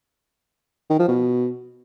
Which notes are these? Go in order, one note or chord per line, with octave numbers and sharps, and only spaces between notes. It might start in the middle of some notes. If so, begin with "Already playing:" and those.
D#3
F3
B2